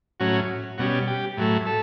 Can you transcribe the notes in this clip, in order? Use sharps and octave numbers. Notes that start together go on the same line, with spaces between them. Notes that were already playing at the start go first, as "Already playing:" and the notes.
A2 F#3 C#4 F#4
B2 G3 C#4 F#4
G4
A2 F#3 A3
A4